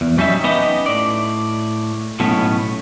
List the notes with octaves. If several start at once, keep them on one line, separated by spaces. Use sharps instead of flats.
E2
F#3 G3 C#4 D#4 E5
B3 C#4 D#4 G4 B4 D#5
A2 D5
B1 A2 B3 C#4